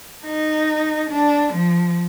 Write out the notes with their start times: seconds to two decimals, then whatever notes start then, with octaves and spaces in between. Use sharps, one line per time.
0.25 D#4
1.10 D4
1.54 F3